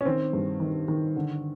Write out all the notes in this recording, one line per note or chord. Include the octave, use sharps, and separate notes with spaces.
C#4
D#3 C4
G2
D#3
D#3
D3